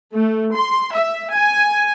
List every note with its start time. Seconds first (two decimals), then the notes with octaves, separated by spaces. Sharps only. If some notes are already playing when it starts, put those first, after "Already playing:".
0.13 A3
0.53 C6
0.93 E5
1.31 G#5